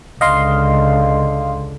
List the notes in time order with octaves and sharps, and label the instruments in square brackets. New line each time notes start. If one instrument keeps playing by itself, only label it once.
[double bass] C#2 D3 [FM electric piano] D#5 F5 C6